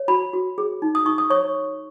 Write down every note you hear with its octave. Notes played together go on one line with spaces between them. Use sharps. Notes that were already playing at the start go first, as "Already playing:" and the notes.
Already playing: C#5
F#4 B5
F#4
G#4
D#4
D#6
D#4 C#6
D#6
C#5 C#6